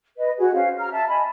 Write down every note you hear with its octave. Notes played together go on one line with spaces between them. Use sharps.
B4 D#5
F#4 G#4
C#4 C5 F5
A#5 F6
E5 A5
D#5 G#5 B5